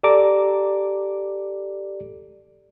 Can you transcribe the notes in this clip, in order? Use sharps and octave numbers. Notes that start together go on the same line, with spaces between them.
G4 A4 D5 A#5 D6